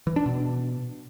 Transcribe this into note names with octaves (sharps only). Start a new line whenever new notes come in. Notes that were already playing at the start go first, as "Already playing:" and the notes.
E3
D4
B2